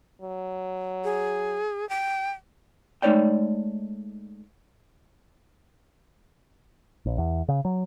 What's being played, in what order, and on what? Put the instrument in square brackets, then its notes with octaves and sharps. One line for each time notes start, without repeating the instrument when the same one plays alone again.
[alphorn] F#3
[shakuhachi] G#4
G5
[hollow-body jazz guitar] G#3 A3 D#4 C#5 D5 G5
[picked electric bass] A#1
E2
C#3
F#3